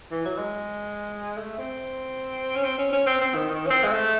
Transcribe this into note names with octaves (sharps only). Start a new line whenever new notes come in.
E3
F#3
G#3
A3
C4
C#4
C4
C#4
C#4
C4
C4
D#3
D#3
C#4
C4
G#3
A3